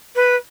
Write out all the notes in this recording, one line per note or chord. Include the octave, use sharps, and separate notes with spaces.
B4